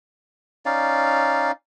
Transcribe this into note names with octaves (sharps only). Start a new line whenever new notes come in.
C#4 D#4 D5 F5